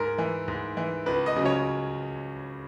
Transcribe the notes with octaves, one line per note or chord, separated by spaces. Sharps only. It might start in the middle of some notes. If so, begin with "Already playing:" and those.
Already playing: G#2 A#4
E3
G#2
E3
C#2 B4
D#5
C#3 F#3
C#5